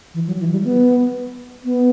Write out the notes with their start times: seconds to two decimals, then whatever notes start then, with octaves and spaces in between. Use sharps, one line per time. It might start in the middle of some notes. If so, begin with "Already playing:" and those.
0.14 E3
0.27 F#3
0.39 E3
0.52 G3
0.64 B3
1.65 B3